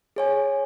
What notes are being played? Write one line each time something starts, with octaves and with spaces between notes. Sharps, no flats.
G#4 C#5 G#5